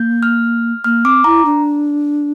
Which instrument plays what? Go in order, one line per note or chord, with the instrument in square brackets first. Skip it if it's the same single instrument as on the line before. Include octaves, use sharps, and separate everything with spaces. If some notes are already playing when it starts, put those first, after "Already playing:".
Already playing: [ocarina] A#3 [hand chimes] G6
[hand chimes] F6
[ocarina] A#3 [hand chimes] F6
[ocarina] C4 [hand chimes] D6
[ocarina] E4 [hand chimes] A#5
[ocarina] D4